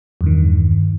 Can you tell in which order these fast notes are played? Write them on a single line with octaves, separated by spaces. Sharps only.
E2 G2 D#3